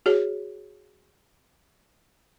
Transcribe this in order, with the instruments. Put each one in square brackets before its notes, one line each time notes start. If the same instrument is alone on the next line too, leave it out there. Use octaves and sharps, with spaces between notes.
[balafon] F#4 G#4 C#5